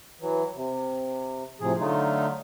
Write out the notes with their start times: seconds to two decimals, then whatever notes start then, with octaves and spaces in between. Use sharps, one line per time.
0.21 E3 F#3
0.55 C3
1.60 A2 C3 F3 G#4
1.79 D3 F#3 A3 D#4 F4